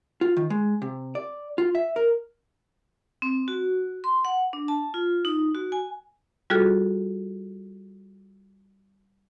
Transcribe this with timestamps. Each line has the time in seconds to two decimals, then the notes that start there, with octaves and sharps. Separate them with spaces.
0.21 F4
0.37 D#3
0.50 G#3
0.82 C3
1.15 D5
1.58 F4
1.75 E5
1.96 A#4
3.22 C4
3.48 F#4
4.04 C6
4.25 F#5
4.53 D4
4.68 A5
4.94 F4
5.25 D#4
5.55 F#4
5.72 G#5
6.50 G3 F4 F#4 G#4 A4